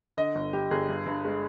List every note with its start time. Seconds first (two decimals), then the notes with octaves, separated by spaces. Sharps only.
0.17 D3 D#5
0.35 G1
0.53 G3 G4
0.71 G1 G#4
0.89 G2
1.06 G2
1.25 G#3